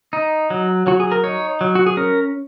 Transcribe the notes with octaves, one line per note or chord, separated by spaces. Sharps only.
D#4
F#3
F#3 F#4
G#4
A#4
D#4 C#5
F#3
F#4
G#4
C#4 A#4